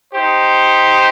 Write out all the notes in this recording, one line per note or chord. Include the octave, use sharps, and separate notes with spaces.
D#4 G4 C5